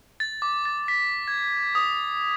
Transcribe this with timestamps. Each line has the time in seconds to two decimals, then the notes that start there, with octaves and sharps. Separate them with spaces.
0.20 A6
0.42 D6
0.65 A6
0.88 B6
1.28 G#6
1.75 D#6